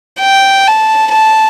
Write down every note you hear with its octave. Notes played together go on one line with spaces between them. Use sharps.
G5
A5
A5